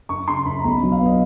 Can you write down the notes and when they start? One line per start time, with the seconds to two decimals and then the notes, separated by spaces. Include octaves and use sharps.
0.09 F#2 C#6
0.28 C#3 C6
0.45 F#2 B5
0.59 A#5
0.64 B1 B5
0.82 F#3
0.92 F5
1.01 B3
1.06 D#5